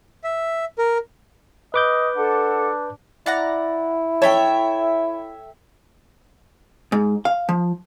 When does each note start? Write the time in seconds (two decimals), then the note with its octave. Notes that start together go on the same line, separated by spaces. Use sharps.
0.24 E5
0.78 A#4
1.74 B4 D#5 D6 G6
2.16 D4 A4 F#5
3.26 E4 D5 F#5 A#5
4.22 A4 C#5 E5 G5
6.92 G#2
7.25 F5
7.49 F3